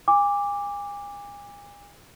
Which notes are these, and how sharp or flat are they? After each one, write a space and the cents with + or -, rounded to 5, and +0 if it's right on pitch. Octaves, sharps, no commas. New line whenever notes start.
G#5 -35 D6 +0